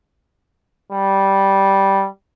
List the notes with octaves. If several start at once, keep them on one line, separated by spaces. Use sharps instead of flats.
G3